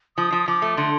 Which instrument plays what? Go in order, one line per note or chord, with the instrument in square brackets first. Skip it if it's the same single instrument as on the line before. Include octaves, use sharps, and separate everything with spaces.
[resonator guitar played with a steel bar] F3 [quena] D#6
[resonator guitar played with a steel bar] F3
[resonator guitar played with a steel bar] F3 [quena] D6
[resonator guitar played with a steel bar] A3
[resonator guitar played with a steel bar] D3 [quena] C6